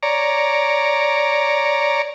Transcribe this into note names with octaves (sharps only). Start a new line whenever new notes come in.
C#5 D5 A#5